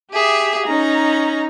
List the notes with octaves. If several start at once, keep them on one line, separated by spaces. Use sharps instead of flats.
G4 G#4 E5
C#4 D#4 A#5